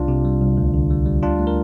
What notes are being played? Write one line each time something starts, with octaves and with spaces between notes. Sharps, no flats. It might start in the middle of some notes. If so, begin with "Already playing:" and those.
Already playing: C2 D4 F4
C3
G3
C2
D2
D3
G3
G3
D2 D4 F4
A3
A#4